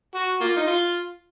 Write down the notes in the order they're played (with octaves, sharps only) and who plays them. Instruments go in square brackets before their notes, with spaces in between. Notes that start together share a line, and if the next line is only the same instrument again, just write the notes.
[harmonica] F#4
A#3 F4
D#4
F4